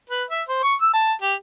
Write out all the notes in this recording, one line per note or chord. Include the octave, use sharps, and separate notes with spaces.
B4
E5
C5
C#6
E6
A5
G4